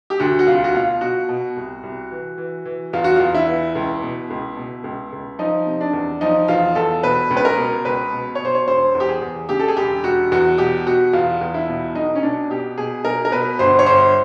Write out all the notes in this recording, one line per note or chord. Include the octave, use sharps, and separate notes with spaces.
G4
D2 F#4
F#4
C2 F4
F#4
B2 F4
B2 F#4
B2
C2
C2
E3
E3
E3
E2 F4
F#4
E2 F4
E4
E3
C#2
B2
C#2
B2
C#2
C#2
F3 D#4
C3
D4
E2
F3 D#4
E2 F4
E2 A4
B2 B4
C#2
B4
A#4
B2
C#2 B4
B2
C#5
B2 C5
C#5
E1 C5
E2
G4
G#4
E2
C#3 G4
A4
G#4
E1 G4
E1 F#4
E2 F#4
B2 G4
B2 F#4
E2 F4
E2
E4
B2
B1 D#4
C#4
B2 D4
B2 G4
B2 G#4
B2 A#4
A#4
B2 B4
G1 C5
C#5
G1 C5